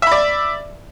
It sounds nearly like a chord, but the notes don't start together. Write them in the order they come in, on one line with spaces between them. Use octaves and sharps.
E5 B5 D5